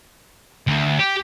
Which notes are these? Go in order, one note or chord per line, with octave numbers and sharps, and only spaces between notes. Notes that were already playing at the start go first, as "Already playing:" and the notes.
D2
G4